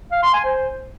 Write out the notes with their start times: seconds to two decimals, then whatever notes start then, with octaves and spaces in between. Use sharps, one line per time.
0.12 F5
0.23 C6
0.34 G#5
0.45 C5